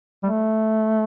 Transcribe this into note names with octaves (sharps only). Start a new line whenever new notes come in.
G3
A3